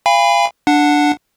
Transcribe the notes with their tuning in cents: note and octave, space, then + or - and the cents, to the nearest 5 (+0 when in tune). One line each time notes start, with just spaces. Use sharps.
F5 -25 G#5 -40 B5 +0
D4 +5 F#5 -10